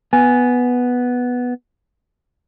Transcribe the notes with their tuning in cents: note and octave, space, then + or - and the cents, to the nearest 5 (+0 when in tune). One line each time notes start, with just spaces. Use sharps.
B3 +0 G#5 +0